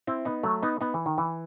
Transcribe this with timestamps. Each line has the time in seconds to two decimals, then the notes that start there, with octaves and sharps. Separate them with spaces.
0.07 C4 E4
0.25 B3 D#4
0.43 F#3 A3
0.63 B3 D#4
0.81 B3 D#4
0.94 E3
1.06 D#3
1.18 E3